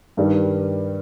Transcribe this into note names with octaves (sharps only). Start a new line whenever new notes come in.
G2 D#3 G3